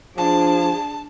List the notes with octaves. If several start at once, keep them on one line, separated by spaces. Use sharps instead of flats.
F3 D4 G#4 A5